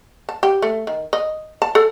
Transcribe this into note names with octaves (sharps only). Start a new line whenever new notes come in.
A5
G4
A3
D#3
D#5
A5
A4